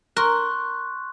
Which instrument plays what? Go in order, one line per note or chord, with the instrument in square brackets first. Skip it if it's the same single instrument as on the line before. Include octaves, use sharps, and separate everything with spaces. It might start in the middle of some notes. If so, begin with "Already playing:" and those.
[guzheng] A#4 [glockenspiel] C6 C#6 F#6